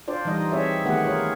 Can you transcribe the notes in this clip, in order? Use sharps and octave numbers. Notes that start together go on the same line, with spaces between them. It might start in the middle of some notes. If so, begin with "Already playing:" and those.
D4 F4 C5 D5
E3 G3 D#4 D#5
C4 E4 G#4 C#5 D5 E5
D#3 A3 B3 G4 G#4 F#5
F4 G#4 A#4 C#5